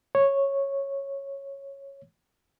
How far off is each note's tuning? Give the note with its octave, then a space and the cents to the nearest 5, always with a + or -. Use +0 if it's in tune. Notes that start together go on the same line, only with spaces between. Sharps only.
C#5 -10